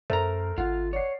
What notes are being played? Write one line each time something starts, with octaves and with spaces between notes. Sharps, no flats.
F#2 A3 A#4 C5 A#5
G#1 F4 F#5
C#5 D5 F#5 C7